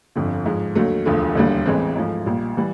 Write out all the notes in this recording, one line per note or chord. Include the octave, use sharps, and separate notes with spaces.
G1 F2 D3 F3
G#2 F3 G#3
D#2 D3 F#3 A3
E1 D2 D3 F3 A3
E1 D#2 D3 G3
A1 A2 E3 G#3 C4
G#2 F3 A3
A#1 A#2 G3
E3 G3